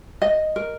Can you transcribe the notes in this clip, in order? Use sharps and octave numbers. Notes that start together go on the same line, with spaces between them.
D#5
A#4